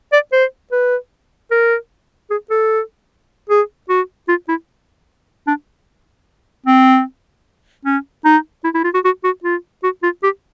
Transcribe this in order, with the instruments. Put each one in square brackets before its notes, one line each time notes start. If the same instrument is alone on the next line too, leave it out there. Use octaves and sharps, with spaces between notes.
[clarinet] D5
C5
B4
A#4
G#4
A4
G#4
F#4
F4
E4
D4
C4
C#4
D#4
E4
E4
F4
F#4
F#4
F#4
F4
F#4
F4
G4